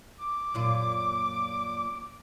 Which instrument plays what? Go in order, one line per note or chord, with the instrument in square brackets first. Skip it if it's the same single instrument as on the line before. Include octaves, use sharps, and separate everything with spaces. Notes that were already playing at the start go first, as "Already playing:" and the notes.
[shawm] D6
[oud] F#2 A#2 F4